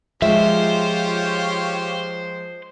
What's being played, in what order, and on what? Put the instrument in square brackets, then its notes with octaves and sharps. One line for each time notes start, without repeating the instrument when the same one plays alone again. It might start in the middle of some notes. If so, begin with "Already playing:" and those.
[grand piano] F3 G#3 [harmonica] F4 G4 C#5 [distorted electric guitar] C5 [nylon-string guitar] E5